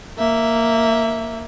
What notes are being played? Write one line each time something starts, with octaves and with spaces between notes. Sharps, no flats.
A#3 E5